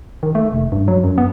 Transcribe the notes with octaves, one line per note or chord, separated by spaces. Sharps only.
D#3
A3
F1
G2
F#3
F#2
B3